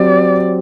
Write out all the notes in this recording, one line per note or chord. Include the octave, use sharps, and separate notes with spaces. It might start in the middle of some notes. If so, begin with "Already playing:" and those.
Already playing: F#3 C4 G4 D5